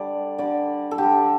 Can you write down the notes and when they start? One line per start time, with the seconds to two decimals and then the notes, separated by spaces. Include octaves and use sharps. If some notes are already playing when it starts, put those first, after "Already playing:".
Already playing: D3 G3 D5
0.38 D3 G3 D5
0.91 A4
0.98 D3 G3 G4